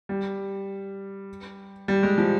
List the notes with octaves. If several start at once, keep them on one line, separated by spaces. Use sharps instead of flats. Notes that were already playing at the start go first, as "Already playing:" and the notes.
G3
G3
G#3
F3